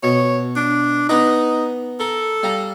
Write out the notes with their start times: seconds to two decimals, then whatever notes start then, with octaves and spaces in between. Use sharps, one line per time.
0.03 B2 C#5
0.56 D4
1.09 B3 D#4 B4 A#5
2.00 A4 A#4
2.43 G3 F5 A#5